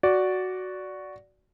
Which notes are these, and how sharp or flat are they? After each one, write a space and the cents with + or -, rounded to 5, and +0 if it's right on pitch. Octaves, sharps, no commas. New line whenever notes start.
F#4 +0 D5 -10